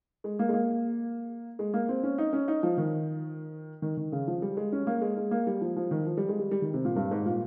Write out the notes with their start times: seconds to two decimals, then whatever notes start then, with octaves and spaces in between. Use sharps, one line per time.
0.24 G#3
0.39 A#3
0.49 G#3
0.53 A#3
1.59 G#3
1.74 A#3
1.89 C4
2.03 C#4
2.18 D#4
2.33 C#4
2.48 D#4
2.63 F3
2.77 D#3
3.82 D#3
3.97 D#3
4.12 C#3
4.27 F3
4.42 G3
4.57 G#3
4.72 C#4
4.87 A#3
5.02 G#3
5.17 G#3
5.31 A#3
5.47 G3
5.61 F3
5.76 F3
5.91 D#3
6.07 F3
6.17 G3
6.29 G#3
6.39 G3
6.51 G3
6.62 D#3
6.74 C3
6.85 A#2
6.96 G2
7.11 G#2
7.26 A#2